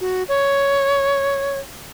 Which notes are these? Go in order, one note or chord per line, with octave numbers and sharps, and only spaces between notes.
F#4
C#5